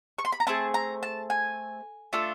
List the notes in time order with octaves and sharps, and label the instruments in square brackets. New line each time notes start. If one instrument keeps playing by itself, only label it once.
[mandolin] C#6
C6
B5
A#5
A3 C4 G#4 A5
A#5
A5
G#5
A3 D4 F4 A4